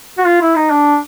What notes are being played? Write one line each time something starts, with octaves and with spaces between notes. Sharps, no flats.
F#4
F4
E4
D#4
D4